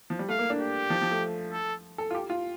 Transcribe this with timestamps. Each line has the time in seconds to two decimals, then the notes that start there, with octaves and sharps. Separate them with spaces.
0.10 F3
0.19 G3
0.29 A3 F5
0.39 A#3
0.50 D4
0.60 G4
0.90 F3
1.02 F3
1.11 A3
1.53 A4
1.98 A4
2.11 F4
2.15 G4
2.30 F4